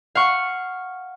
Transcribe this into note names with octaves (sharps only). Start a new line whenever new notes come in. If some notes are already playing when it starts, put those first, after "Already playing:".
F5 F#5 C#6